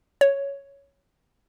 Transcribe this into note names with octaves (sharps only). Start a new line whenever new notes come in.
C#5